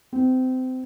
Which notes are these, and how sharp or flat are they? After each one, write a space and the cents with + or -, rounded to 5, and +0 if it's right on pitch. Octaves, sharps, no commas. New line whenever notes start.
C4 -25